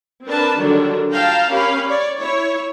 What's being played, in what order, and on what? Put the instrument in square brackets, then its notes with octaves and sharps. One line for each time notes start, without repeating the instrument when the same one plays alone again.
[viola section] C4 D4 A#4 B4 A5
D3 D#3 F#3 G3 D4
F4 F5 G5 A5 A#5
C#4 G4 A#4 F5 B5
C#5 D5
E4 C#5